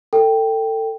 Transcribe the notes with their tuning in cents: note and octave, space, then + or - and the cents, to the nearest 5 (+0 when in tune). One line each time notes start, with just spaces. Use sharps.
A4 +25 G5 +0